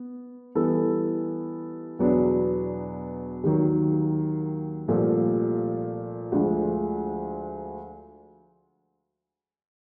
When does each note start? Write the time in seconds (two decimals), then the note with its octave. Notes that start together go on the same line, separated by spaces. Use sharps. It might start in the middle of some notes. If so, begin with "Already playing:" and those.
Already playing: B3
0.55 E3 G3 B3 E4 A4
1.99 E2 B2 F#3 B3 D4
3.44 D#2 D#3 F#3
4.88 C2 A#2 F3 A3
6.32 D2 D3 F3 G#3